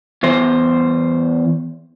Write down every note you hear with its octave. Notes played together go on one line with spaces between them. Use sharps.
E2 E3 C5